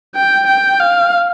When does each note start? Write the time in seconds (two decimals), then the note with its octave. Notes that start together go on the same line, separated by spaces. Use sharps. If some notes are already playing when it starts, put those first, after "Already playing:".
0.15 G5
0.47 G5
0.80 F5